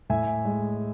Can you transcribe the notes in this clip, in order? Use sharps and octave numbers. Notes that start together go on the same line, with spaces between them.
A2 E5 G#5
G#3